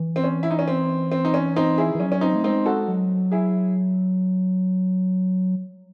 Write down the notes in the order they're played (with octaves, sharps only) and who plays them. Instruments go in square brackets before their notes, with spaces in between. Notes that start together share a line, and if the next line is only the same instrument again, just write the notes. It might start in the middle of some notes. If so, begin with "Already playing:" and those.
Already playing: [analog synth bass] E3
[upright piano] C4
C#4
E4
D#4
C#4
C4
C4
D#4
C#4
C4 D#4
E4 G#4
[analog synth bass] E3
[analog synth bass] F#3 [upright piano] C#4
[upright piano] C#4
C4 D#4
[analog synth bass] A3
[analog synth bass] G#3 [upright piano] C4 D#4
[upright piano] F#4 A4
[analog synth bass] F#3
[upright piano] E4 G#4